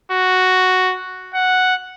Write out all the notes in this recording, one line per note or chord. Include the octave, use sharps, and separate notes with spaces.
F#4
F#5